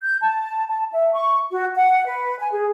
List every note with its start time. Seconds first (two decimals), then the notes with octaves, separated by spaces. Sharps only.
0.03 G6
0.22 A5
0.69 A5
0.92 E5
1.13 C#6
1.52 F#4
1.75 F#5
2.06 B4
2.39 G#5
2.51 G#4